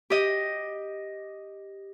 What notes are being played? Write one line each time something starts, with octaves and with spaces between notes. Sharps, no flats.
G4 D#5